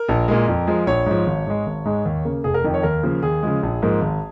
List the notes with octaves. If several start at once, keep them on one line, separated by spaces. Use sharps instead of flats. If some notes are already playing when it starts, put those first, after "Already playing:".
Already playing: A#4
A#1
A#2 G#3
F2
F3 G#3
A#1 C#5
G#2 F3
G#1
G#2 G#3
G#1
G#2 G#3
D#2
C#3 A#3
F1 G#4
A#4
F2 D#3
C#5
D#2 A#4
C#3 F3 A#3
D#2 G#4
C#3 F3 G#3
A#1
G#2 F3 A#3
G#1